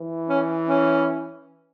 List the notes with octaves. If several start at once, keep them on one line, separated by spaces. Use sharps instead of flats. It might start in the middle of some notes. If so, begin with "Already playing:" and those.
Already playing: E3
C#4
C#4